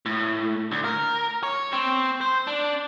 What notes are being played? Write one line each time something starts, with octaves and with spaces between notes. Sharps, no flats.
A2
D2
A#4
C#5
C4
C5
D4